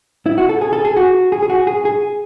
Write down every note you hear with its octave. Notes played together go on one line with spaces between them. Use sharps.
E4
F#4
A4
G#4
A4
G#4
F#4
G#4
G#4
F#4
G#4
G#4